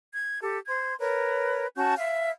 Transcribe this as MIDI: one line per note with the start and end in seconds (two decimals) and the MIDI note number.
0.12 0.39 92
0.40 0.57 67
0.40 0.57 69
0.68 0.94 72
0.68 0.94 84
0.68 0.94 92
0.99 1.66 70
0.99 1.66 71
0.99 1.66 73
1.76 1.94 61
1.76 1.94 66
1.76 1.94 81
1.76 1.94 91
1.97 2.31 76
1.97 2.31 77